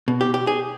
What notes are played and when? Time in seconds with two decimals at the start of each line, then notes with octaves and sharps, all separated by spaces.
0.08 B2
0.21 G4
0.34 G4
0.47 G#4